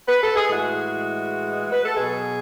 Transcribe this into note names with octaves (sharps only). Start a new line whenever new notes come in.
B4
A4
G#4
A2 E3 G#3 F#4
B4
A4
B2 F#3 G#4